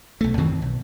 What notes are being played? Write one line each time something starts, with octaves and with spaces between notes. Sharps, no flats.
B1 A3
F#2 D#3 E3 C4
B1